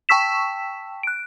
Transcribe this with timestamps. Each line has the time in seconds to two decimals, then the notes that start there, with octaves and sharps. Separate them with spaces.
0.09 G5 A5 C#6 E6 B6 E7
1.03 F#6 D7